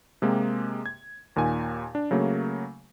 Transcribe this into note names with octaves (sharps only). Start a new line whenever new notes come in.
C3 G#3 A#3 G4
G#6
D#2 A#2 D#3 G#5
D4
C#3 F#3 A3 A#3